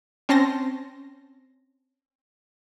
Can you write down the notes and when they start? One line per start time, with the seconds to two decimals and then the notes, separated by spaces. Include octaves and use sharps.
0.29 C4 C#4 A5 C6 A#6